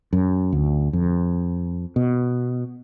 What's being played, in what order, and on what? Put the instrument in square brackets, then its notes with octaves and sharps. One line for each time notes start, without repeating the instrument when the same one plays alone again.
[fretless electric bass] F#2
D2
F2
B2